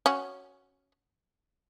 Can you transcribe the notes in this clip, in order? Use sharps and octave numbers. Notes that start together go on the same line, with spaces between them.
C#4 F#4